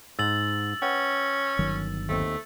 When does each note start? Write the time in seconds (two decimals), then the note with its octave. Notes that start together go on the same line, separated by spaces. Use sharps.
0.19 G#2 E6 A6 F#7
0.82 C#4 B4 F#5 G5
1.59 G1 D#3 F#3
2.09 D#2 A3 C4